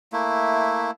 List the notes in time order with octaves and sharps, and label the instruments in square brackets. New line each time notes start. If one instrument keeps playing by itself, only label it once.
[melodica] A3 A#3 E4